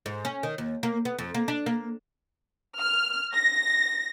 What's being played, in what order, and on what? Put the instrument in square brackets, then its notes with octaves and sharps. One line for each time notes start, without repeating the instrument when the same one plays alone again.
[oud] G#2
C#4
D#3
D#2
A#3
B3
F2
A#3
D4
A#3
[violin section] F6
A#6